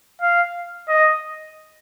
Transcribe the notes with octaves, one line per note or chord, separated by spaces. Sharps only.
F5
D#5